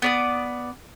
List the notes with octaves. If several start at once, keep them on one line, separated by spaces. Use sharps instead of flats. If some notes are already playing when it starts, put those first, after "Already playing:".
B3 D5 D#6